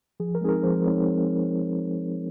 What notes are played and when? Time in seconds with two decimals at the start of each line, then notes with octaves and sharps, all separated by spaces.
0.20 F3 G#4
0.35 A#4
0.41 G#3 C4 D#4 G#4
0.49 A#4
0.63 F3 C5
0.86 G#3 C4 D#4 C#5